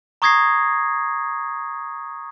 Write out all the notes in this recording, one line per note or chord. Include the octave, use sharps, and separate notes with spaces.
A#5 C#6 D#6 G#6 A#6 C7